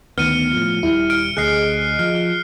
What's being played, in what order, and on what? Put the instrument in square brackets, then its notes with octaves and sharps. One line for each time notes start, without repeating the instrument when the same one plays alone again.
[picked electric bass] D2 D#3 [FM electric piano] B3 [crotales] F6 C#7 D#7
[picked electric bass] A2 F3
[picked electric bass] D#1 G3 [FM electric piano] E4
[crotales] F6 D7
[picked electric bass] D2 [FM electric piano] G#4 D#5 [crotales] F#6 C7
[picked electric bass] F3 [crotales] F6